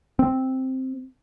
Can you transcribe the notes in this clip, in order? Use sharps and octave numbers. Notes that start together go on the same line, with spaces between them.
C4